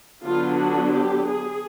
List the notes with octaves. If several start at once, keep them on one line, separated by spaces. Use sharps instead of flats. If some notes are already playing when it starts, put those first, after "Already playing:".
D3 F#3 B3 D4 F4
F#4
G4
G#4